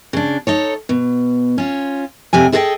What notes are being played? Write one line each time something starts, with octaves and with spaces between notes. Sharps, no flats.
C#3 D4
D#4 A4 C#5
B2
C#4 F4
F2 C3 G3 G#5
E4 G#4 A4 C5 D#5 G5